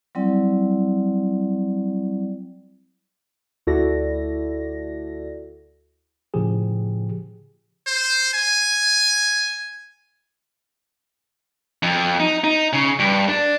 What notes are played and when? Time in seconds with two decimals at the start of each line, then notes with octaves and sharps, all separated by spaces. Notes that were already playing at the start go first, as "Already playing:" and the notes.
0.15 F#3 G3 C4 E4 D5
3.67 D2 E4 F#4 A4 D5 A#6
6.34 A2 C#3 F3 G4 G#4
7.87 C5
8.34 G#5
11.83 F2
12.20 D#4
12.44 D#4
12.73 C#3
12.99 G2
13.29 D4